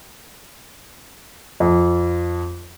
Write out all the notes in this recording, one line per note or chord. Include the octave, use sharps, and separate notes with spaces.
F2